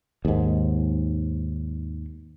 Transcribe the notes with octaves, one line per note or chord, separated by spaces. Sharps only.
D#2 G#2